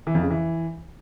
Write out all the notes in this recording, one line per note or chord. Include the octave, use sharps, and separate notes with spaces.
E3
F2
C#3
E3